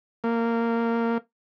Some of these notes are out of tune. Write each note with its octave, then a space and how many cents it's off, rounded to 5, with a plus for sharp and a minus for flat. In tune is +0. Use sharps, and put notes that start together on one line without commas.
A#3 -15